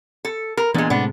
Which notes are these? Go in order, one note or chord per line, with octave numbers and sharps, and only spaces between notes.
A4
A#4
A#2 E3 G#3 B3 D4
A2 C3 G#3 B3 D4